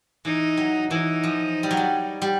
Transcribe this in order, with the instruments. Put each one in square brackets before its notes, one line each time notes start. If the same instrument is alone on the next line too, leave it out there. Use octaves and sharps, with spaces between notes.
[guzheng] E3 [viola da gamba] D#4
[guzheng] F#3
[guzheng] E3 [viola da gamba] D#4
[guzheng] F3
G3
F#3
G3
G3